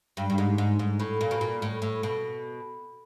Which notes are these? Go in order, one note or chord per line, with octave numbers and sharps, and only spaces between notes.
G2
G2
G#2
G#2
G#2
A2
A#2
B2
A#2
A2
A2
B2